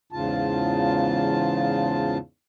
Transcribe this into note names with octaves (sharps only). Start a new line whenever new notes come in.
E2 G#2 C#3 F4 A5